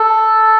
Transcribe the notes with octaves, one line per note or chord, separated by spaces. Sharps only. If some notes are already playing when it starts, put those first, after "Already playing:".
Already playing: A4